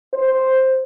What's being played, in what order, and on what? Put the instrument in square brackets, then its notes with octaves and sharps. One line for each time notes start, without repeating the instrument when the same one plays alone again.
[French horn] C5